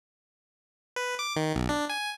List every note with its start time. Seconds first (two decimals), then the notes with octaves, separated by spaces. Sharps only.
0.96 B4
1.19 D6
1.36 D#3
1.55 B1
1.69 D4
1.90 G#5